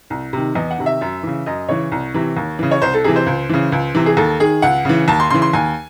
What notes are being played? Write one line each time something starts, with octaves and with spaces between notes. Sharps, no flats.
C2
C3 D#3
E2 D#5
F#5
C3 D#3
E5
F#2
C#3 E3
F#2 D#5
C#3 E3 C#5
C2
C3 E3
D#2
C#3 E3
C#5
C2 C5
A4
C3 E3 G#4
C5
C#2
C#3 E3
C#2
C3 E3
G#4
D#2 A4
D#3 G#4
C#2 F#5
C#3 E3
D#2 A5
C6
C#3 E3 C6
C6
D#2 G#5